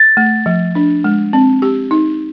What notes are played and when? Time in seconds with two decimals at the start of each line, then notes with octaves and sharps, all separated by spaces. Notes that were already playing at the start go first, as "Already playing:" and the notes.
Already playing: A6
0.17 A3
0.46 F3
0.75 D4
1.04 G#3
1.33 C4
1.62 G4
1.91 D#4